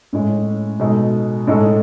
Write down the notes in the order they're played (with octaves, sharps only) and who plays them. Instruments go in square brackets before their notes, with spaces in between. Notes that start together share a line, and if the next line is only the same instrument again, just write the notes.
[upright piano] A2 G#3 C#4
B2 G#3 D#4 A4 D#5
A2 G#3 D#4 A4